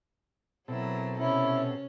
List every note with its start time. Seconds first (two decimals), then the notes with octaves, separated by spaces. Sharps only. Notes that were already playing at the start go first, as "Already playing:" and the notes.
0.68 B2 F#3 C4 E4 A4 A#4
1.19 C3 C#4 E4